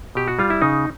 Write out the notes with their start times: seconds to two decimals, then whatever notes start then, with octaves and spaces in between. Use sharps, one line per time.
0.15 B2 G4
0.28 F#4
0.39 G3 F4
0.50 E4
0.61 C#3 D#4